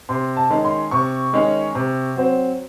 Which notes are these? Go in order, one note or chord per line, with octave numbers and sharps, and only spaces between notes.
C3 C6
A5
D#3 G#3 C#4
C6
C3 C#6
D#3 G#3 C#4
C3
F#3 C4